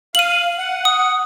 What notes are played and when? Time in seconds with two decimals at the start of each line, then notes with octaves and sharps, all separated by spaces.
0.15 F5 D#7 F#7
0.58 F#5
0.85 D#6